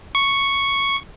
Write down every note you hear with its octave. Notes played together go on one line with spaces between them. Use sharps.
C#6